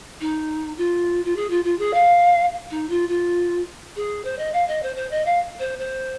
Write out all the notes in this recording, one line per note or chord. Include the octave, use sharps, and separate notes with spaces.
D#4
F4
F4
G#4
F4
F4
G#4
F5
D#4
F4
F4
G#4
C5
D#5
F5
D#5
C5
C5
D#5
F5
C5
C5